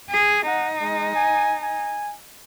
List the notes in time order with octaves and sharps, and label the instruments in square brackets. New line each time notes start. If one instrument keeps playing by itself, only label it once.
[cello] G#4
[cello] D#4 [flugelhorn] F#5
[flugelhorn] G#3
G#5
G#5